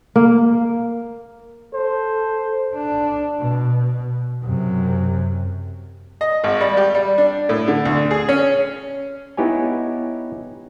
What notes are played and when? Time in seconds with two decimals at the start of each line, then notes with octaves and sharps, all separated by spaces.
0.16 A#3
1.74 A4 C5
2.75 D4
3.39 B2
4.43 F#2 C3
6.21 D#5
6.44 G#1
6.61 G3
6.77 G4
6.95 G3
7.18 D4
7.49 A2
7.68 D3
7.85 D2
8.11 G#4
8.29 C#4
9.37 B3 D#4 E4 G4 C#5 G#5